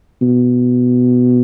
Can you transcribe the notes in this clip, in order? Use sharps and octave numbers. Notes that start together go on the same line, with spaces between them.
B2